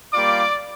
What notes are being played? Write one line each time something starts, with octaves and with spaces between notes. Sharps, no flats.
G3 A#3 F4 D5 D6